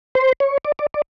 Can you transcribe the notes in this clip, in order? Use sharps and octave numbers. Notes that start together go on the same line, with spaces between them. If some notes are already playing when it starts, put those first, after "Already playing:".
C5
C#5
D5
D5
D5